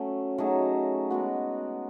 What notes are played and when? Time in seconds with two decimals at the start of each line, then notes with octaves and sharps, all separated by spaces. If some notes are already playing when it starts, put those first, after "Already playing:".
Already playing: F#3 A3 C#4
0.38 F#3 A3 D#4 G#4
1.11 G#3 B3 F#4